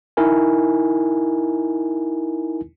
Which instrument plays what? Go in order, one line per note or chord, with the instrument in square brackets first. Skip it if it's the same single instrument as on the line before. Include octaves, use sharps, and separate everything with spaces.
[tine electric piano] D#4 E4 A#4 G#5